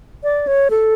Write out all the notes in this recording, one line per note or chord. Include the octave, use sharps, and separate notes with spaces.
D5
C#5
A4